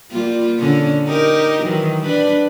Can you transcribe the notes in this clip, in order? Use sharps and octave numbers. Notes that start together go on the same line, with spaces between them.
G3 A#3 F4
D3 C#4
D#4 G4 A#4
D#3 E3 F#3
G3 D4 B4